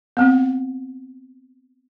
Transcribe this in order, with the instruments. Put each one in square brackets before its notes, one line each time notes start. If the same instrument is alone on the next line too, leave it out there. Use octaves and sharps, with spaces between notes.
[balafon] B3 C4